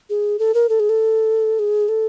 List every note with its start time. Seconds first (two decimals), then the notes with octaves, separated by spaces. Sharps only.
0.10 G#4
0.39 A4
0.54 A#4
0.69 A4
0.80 G#4
0.89 A4
1.59 G#4
1.89 A4